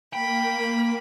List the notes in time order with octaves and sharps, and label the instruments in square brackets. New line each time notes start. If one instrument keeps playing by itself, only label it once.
[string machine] A#3 [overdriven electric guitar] G5 [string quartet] B5